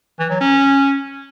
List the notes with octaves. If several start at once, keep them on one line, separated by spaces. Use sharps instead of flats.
E3
F#3
C#4